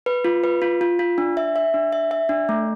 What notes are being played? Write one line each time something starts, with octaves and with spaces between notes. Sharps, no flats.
B4
F4
B4
F4
F4
F4
D4
E5
E5
D4
E5
E5
D4
A3